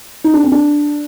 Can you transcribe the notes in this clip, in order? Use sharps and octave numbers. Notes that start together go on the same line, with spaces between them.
D#4
D4
C4
D4